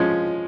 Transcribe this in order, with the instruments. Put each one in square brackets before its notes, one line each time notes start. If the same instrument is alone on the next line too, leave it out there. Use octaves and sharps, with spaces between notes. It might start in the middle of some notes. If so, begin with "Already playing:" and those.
Already playing: [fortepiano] F3 G#3 C#4